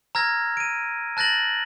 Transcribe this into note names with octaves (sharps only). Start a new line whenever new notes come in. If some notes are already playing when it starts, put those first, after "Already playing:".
A#5 E6 F6 G#6 A#6
D7 D#7
A5 F#6 A6 A#6 F#7